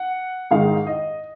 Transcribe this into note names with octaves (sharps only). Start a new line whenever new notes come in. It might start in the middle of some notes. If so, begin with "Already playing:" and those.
Already playing: F#5
G#2 D#3 G#3 F5
D#5